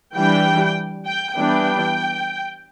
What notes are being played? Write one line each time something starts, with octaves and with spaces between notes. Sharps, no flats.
E3 G3 D4 G5
G5
E3 G3 B3 D4 G5